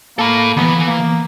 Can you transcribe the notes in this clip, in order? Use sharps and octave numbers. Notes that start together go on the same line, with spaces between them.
A#3 A4 B5
D#2 E3 B3
A#3